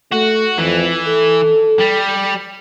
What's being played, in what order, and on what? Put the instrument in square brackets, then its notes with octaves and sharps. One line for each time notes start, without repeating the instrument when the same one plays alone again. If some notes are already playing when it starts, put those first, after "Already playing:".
[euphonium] A3 [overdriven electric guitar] F#4
[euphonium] F2 [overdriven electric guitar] E3
[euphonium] A4
[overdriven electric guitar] G3